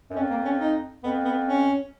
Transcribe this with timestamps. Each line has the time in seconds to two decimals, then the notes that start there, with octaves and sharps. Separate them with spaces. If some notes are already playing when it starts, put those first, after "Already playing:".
0.10 F#2
0.16 F2 C#4
0.30 A#3
0.45 C#4
0.59 D#4
1.03 F2 B3
1.25 B3
1.46 C#4